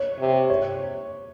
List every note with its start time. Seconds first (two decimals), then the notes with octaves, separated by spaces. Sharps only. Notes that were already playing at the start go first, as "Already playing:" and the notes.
Already playing: C#5
0.19 C3
0.50 C#5